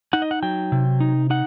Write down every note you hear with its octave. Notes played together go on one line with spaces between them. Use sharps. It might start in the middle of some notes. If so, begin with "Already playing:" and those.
D#4 F#5
D#5
F#5
F#3 G5
C3
D#4
D#4 F#5